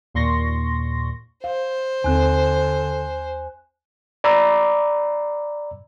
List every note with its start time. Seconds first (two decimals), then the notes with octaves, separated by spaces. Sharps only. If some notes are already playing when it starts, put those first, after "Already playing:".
0.14 D#2 A#2 C6 C#6 A#6
1.44 C5 F5
2.04 D#2 D3 C4 G#5 F#6
4.24 D5 A#5 B5 D6 E6